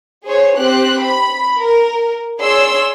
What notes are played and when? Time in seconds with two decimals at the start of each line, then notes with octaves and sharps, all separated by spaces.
0.24 G#4 C5 C#5
0.57 C4 G4 F#6
1.01 B5
1.58 A#4
2.40 G#4 C#5 D5 C6 E6